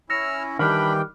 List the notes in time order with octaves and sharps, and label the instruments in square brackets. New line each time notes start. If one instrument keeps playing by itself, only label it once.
[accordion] C#4 E4 [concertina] E6 F6 [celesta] A#6 C#7
[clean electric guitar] D#3 G3 [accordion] E3 G5 [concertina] D4 B5 [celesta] F6 F#6